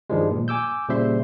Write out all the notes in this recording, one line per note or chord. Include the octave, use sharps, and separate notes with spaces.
G2 D#3 F3 G3 G#3
A#2
G#5 D6 E6 G6
A#2 C#3 G3 C5 E5 C6